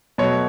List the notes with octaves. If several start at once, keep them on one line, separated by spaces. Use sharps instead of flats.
B2 F#3 A3 C#5